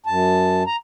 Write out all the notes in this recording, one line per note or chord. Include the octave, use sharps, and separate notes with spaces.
F#2 A5
A#5